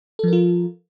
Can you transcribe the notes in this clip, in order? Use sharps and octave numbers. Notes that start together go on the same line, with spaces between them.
F3 F4 A4 A#4